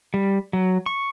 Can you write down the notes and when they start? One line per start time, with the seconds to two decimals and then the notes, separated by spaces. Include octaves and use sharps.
0.14 G3
0.53 F#3
0.86 C#6